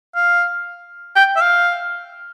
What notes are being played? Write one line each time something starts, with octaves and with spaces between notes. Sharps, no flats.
F5
G5
E5
F5